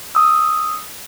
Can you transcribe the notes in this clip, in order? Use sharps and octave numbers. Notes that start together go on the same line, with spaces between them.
D#6 E6